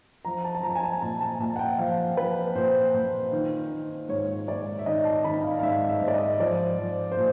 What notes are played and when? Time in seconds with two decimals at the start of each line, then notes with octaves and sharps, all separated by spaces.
0.25 F3 A#5
0.44 A5
0.55 A5
0.63 F3 A#5
0.75 G#5
0.83 A5
1.02 A#2 A5
1.21 A5
1.40 A#2 A5
1.56 F#5
1.59 G5
1.78 F3 F5
2.17 F3 B4
2.55 A#2 C5
2.94 A#2
3.32 D#3
3.71 D#3
4.09 G#2 C#5
4.48 G#2 D5
4.79 E5
4.86 D#3 D#5
5.05 A5
5.24 D#3 B5
5.44 F5
5.59 F5
5.63 G#2 E5
5.89 E5
6.01 G#2
6.08 D5
6.14 D#5
6.39 F3 D5
6.79 F3
7.12 C5
7.17 A#2